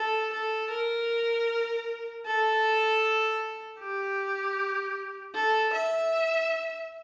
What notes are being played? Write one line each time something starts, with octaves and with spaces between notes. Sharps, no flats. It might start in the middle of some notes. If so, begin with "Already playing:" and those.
Already playing: A4
A4
A#4
A4
G4
A4
E5